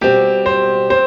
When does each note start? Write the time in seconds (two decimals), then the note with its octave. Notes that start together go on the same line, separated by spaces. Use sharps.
0.01 B2 G3 C4 G4
0.46 C5
0.90 C4 C5